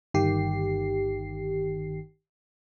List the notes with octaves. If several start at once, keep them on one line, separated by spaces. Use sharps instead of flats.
G1 D#3 G4 C7